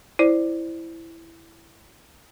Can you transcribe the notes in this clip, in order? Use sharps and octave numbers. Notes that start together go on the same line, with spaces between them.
E4 C5 D5